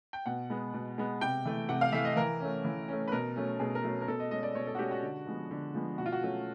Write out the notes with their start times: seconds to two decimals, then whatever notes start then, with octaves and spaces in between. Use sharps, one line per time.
0.13 G5
0.26 B2 F#5
0.50 G#3 B3
0.74 B2
0.98 G#3 B3
1.21 C3 G5
1.45 E3 A3
1.69 C3 F#5
1.81 F5
1.92 E3 A3 E5
2.05 D#5
2.16 E3 A#4
2.40 A3 C#4
2.64 E3
2.88 A3 C#4
3.08 B4
3.12 B2 A#4
3.36 F#3 A3 C#4
3.60 B2 G#4
3.75 A#4
3.84 F#3 A3 C#4
4.01 A#4
4.08 B2 A4
4.20 D#5
4.31 G#3 C#4 D#5
4.43 D5
4.55 B2 C#5
4.67 A4
4.75 F#4
4.79 G#3 C#4 G4
4.91 F#4
5.02 D3
5.27 F3 G#3 B3
5.51 D3
5.74 F3 G#3 B3
5.98 B2 F#4
6.06 F4
6.12 F#4
6.23 F#3 A3 C#4